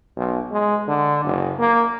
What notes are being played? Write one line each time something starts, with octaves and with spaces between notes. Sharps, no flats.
B1
G#3
D3
F#1
A#3